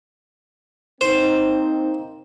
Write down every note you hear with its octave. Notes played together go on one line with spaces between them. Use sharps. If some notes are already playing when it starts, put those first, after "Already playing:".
A#3 C4 D#4 C5